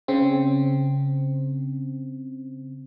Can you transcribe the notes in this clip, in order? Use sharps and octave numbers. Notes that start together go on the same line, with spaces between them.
C#3 C4